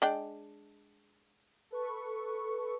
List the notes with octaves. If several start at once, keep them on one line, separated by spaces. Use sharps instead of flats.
G#3 D4 G5
A4 B4 C#6